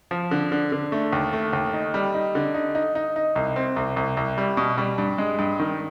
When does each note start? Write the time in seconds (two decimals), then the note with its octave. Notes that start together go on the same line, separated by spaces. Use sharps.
0.11 F3
0.31 D3
0.52 D3
0.72 D3
0.92 A3
1.13 D#2
1.33 A3
1.53 D#2
1.73 D#4
1.94 G3
2.14 D#4
2.35 D3
2.54 D#4
2.75 D#4
2.95 D#4
3.16 D#4
3.36 C2
3.56 C4
3.76 C2
3.96 C2
4.17 C2
4.38 G3
4.57 B2
4.78 G3
4.98 G2
5.18 G#3
5.39 G2
5.59 D#3